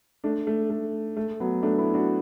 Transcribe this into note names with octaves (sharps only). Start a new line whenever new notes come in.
A3 D4
A3
A3
A3
F#3 B3
A3 D4
B3 E4
D4 F#4